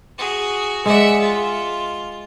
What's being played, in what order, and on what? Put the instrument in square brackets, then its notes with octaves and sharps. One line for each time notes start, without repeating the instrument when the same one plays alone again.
[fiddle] F#4 G#4
[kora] G#3 D5 [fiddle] E5 F#5
[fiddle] F4